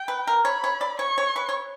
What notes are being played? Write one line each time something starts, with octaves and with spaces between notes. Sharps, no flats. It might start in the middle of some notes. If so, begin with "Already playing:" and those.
Already playing: G5
B4
A#4
C#5 B5
C#5
D5
C#5 C#6
C#5
B4
C#5